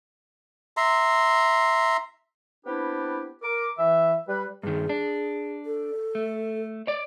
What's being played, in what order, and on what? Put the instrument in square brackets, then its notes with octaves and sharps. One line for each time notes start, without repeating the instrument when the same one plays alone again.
[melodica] E5 A#5 C6
[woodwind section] B3 C4 D4 E4 G4 B4
A#4 D6
E3 E5
G3 B4
[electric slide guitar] G2 D#3 [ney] G#4
[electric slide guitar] D4
[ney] A4
[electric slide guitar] A3
C#5 D5